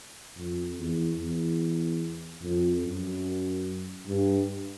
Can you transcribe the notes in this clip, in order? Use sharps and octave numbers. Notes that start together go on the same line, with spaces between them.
F2
E2
E2
F2
F#2
G2